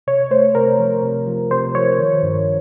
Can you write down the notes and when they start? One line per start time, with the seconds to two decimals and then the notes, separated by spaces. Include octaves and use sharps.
0.07 C3 C#5
0.31 A3 C5
0.55 C3 A#4
0.79 F3
1.03 C3
1.27 F3
1.51 C3 C5
1.75 F3 C#5
1.99 D#3
2.23 G2